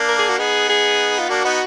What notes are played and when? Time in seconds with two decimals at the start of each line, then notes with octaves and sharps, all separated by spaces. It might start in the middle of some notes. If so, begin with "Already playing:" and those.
Already playing: A#3 D4
0.09 A#4
0.18 G#4
0.29 F#4
0.38 B3 D#4 G#4
0.69 G#4
1.19 F4
1.29 A#3 D4 F#4
1.44 B3 D#4